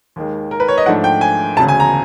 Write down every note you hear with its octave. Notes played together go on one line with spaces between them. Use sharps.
D#2 D#3 G#3
A#4
B4
C#5
D#5
G#2 F3 A3 D4 F#5
G5
G#5
E1 D2 C#3 A5
G#5
A#5